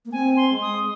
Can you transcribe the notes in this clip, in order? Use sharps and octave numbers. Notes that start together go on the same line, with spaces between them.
A#3
C4 G#5
C6
G#3
D#6